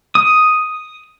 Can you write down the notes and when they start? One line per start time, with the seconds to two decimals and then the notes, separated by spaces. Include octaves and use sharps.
0.15 D#6